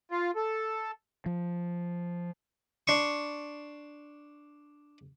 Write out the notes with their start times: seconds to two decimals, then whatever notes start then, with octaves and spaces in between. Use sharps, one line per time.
0.11 F4
0.36 A4
1.26 F3
2.87 D4 C6 C#6